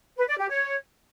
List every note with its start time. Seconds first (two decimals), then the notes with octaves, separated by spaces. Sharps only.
0.17 B4
0.28 D5
0.38 G4
0.49 C#5